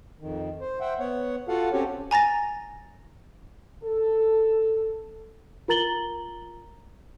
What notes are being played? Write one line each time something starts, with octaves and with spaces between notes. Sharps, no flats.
F2 D#3
C5
C5 E5 F#5 G5
B3 C#5 F#5
F4 F#4 A4 F5 F#5
C4 C#4 F#4 G4 A4 C#5
G#5 A#5 A6 A#6
A4
F4 A#4 A#5 A6 F#7 G7